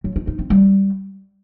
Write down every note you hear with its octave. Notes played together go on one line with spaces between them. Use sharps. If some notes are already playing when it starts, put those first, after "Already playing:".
F#3
D#4
D#4
C4
G3